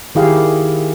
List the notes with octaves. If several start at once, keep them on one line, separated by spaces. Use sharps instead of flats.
D#3 E4 G4 G#4 F5